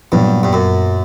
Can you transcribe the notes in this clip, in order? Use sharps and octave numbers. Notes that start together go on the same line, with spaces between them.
G2 A#2 F#3 B3
G2
F#2